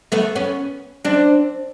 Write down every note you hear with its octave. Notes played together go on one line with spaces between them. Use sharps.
A3 B3
B3 C#4
C4 D4